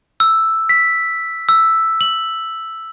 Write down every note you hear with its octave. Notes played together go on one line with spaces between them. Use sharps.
E6
B6
E6
F#7